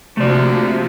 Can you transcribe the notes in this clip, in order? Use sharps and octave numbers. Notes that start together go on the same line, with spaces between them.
C3 F3 A3 A#3 D4 F#4 D5